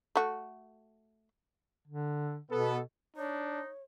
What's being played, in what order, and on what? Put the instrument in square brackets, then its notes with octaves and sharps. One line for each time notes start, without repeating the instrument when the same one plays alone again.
[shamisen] A3 F#4
[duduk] D3
[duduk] B2 [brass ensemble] B3 A4
[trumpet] D4 [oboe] D#4 [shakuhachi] C#5